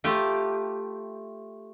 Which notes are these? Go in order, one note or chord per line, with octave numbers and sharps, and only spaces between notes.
A3 F4 G4